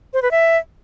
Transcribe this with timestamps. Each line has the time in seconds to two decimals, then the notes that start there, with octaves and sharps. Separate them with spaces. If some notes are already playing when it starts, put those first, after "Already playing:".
0.14 C5
0.22 B4
0.31 E5